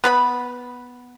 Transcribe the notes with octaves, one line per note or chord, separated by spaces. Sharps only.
B3 B4 B5